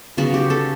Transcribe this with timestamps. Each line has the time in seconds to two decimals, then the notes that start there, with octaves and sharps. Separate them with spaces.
0.17 C#3 F#3 B3 F#4
0.34 G4
0.50 A4